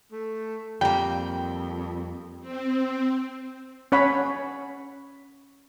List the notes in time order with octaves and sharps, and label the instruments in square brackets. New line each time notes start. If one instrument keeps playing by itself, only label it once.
[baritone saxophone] A3
[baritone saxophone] F2 [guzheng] G3 A#3 [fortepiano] G5
[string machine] C4
[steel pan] C#4 C#5 F#5 B5